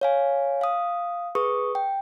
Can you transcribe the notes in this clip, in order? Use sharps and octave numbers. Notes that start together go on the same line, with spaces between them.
C#5 F5 G#5
F5 D#6
G#4 B4 C#6 D#6
G5